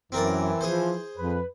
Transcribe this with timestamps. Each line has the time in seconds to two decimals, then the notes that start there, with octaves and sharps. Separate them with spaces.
0.12 F#2 E3 C4 A#4 D5
0.61 F3 G#4 C5
1.17 F2 B4